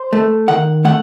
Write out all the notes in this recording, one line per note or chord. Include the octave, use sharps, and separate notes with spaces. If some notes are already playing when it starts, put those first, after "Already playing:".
Already playing: C5
A3
D#3 F#5
A3 F#5